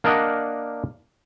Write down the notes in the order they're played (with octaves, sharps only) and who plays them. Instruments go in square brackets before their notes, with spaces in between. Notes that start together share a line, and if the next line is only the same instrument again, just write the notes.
[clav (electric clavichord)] A#3 D4 A#4 D5 D#5 F#5